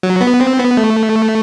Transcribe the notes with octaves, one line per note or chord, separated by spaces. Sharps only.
F#3
B3
C4
B3
A3